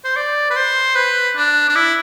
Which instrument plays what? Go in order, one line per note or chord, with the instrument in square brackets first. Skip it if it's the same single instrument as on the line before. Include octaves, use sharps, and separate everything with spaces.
[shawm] C5
D5
B4
C5
B4
D4
D4
E4